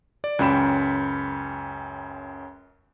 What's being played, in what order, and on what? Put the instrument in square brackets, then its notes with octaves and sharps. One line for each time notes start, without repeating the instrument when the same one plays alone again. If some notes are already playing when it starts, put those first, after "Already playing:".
[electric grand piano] D5
C#2 F#2 C#4 G5 B5 E7